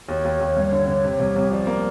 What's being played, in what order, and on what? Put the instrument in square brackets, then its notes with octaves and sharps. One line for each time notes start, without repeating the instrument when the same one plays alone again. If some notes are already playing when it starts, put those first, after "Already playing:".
[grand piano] D#2 [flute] C#5
[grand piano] D#2
D#2
G2
D3
D3
C3
C2
C2
[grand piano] F3 [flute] D5
[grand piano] A#3